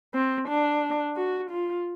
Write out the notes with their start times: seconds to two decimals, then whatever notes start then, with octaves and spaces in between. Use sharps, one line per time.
0.14 C4
0.49 D4
1.17 F#4
1.51 F4